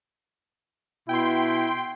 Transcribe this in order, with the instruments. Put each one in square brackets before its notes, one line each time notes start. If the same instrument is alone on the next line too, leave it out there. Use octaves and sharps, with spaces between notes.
[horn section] B2 E4 [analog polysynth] G5 C6